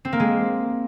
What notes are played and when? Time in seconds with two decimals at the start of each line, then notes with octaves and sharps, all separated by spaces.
0.05 C4
0.13 A#3
0.20 G#3